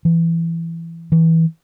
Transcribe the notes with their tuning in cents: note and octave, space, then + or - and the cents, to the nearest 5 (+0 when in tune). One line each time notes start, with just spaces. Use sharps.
E3 +15
E3 -20